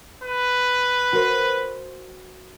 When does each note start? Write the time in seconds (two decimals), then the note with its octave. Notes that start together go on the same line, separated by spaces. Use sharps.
0.24 B4
1.13 F#4 A#4 C5